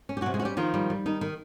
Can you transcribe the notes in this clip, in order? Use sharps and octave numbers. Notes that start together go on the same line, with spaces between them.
C#4
G4
F#3 F#4
C3
G#3 G#4
F#4
G3 C#4 G4
D#3 F3 F4
G3
G3
D#3 D#4
D#3